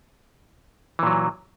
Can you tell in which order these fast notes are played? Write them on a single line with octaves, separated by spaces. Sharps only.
E3 A#2 F#3